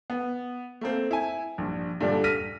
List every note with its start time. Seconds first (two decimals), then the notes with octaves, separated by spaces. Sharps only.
0.10 B3
0.81 A3 A#3 C4
1.11 E4 G#5
1.58 A#1 G2
2.01 G2 A#2 D3 G3 A3 D4
2.24 F6 A#6 B6 D#7